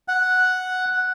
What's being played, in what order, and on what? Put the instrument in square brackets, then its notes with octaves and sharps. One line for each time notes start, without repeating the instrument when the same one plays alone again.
[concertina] F#5